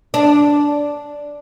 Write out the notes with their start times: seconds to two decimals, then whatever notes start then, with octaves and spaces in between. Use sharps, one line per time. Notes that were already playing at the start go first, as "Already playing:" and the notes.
0.14 D4